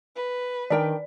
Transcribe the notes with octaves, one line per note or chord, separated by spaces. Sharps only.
B4
D#3 D4 A#4 D5 G5